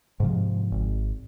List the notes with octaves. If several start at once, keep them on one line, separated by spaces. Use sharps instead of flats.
G#2 C3 F3
G#1